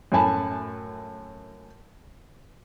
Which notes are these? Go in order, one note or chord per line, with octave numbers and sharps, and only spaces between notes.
F#2 A2 A3 G#5 A5 B5